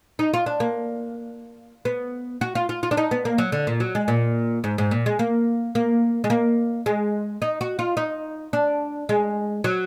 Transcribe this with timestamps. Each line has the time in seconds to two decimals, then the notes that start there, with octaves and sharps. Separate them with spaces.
0.19 D#4
0.34 F4
0.46 D4
0.60 A#3
1.85 B3
2.41 F#4
2.55 F4
2.69 F4
2.83 F4
2.91 D4
2.97 D#4
3.11 B3
3.25 A#3
3.38 F#3
3.52 D3
3.67 A#2
3.80 F#3
3.95 G#3
4.08 A#2
4.64 G#2
4.78 G#2
4.91 A#2
5.06 G#3
5.19 A#3
5.75 A#3
6.24 G#3
6.30 A#3
6.86 G#3
7.42 D#4
7.61 F#4
7.79 F4
7.97 D#4
8.53 D4
9.09 G#3
9.64 F#3